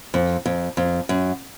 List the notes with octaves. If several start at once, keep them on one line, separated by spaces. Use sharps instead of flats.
F2
F2
F2
F#2